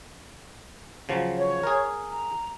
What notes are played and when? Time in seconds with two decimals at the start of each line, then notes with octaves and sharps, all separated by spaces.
1.09 C#3 F3 F#3
1.38 C#5
1.63 G#4 A#4
2.09 A#5